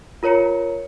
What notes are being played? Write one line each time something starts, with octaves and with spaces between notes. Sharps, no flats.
F4 A#4 C#5 A#5 C#7